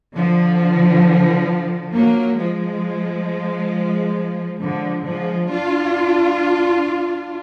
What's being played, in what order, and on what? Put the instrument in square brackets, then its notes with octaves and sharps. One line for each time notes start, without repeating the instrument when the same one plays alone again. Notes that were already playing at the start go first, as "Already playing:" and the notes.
[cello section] D3 F3
F#3 A#3
F3 G#3
D3 F3
F3 G#3
D4 F4